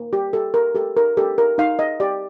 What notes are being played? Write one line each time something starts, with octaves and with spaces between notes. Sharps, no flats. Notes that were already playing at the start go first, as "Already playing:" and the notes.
Already playing: A#3
G4
G4 A4
A#4
G4 A4
A#4
G4 A4
A#4
D#4 F5
D#5
G4 D5